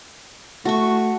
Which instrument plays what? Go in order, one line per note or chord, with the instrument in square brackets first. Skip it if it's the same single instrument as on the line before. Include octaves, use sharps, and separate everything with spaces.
[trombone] A3 [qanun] F#4 C#6